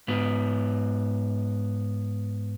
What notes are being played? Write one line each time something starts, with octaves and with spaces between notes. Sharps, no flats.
G#2 B3